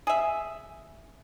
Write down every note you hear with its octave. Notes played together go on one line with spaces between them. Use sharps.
G#4 E5